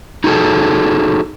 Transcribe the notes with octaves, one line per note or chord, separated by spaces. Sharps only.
D#4 F#4 G#4 A4